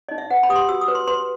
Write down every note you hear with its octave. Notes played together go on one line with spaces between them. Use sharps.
D#4 D#5
E5
B4 F#5
B5
G4 D#6
C6
F#4 E6
D#6
B4
C6
B4 C6